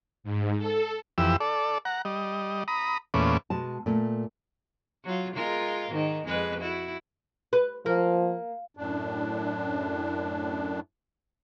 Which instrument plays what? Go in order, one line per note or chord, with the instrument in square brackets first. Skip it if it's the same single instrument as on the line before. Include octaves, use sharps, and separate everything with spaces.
[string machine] G#2
A4
[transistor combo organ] F2 E3 G4 E6
A4 D5
F#5 A#5
G3 D#5
A#5 B5 D#6
E2 A#2 A3 C#4 B4 D6
[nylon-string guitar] B2 G#3 A5
A#2 A3
[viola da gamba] F#3 F4
G#3 F4 A#4
G#2 D#3
F2 G#3 B4
E4 F#4
[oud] B4
[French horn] F3 [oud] A#3
[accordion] F#2 A2 D4